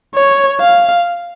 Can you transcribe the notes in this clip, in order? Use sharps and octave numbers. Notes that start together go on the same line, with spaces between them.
C#5
F5